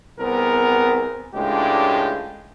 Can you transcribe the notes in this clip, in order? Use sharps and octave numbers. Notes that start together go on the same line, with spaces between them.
C2 B3 C4 G#4 A#4
C#2 A2 G#3 D4 F4 G4